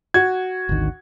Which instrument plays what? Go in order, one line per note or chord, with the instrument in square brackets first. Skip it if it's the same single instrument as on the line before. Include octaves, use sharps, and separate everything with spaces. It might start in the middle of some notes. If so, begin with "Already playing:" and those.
[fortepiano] F#4 [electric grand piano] G#6
[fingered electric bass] G#1 D2 D#3